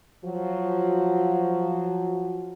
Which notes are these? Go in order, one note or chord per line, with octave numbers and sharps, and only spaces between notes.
F3 F#3 F#4